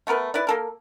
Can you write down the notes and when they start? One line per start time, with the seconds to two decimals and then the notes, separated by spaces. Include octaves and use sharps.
0.07 A3 B3 A#4 B4
0.34 E4 B4 D5
0.47 A#3 A4 A#4